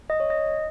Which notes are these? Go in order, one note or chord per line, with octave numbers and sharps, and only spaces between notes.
D#5
C#5
D#5